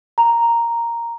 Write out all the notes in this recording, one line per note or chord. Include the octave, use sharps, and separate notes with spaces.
A#5